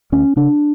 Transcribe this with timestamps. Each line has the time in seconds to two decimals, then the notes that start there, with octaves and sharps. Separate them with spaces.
0.12 D2 C#4
0.36 C#3 D4